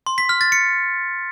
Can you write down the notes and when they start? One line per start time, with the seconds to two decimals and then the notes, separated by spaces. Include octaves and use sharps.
0.06 C6
0.18 B6
0.29 F6
0.41 A6
0.52 C#7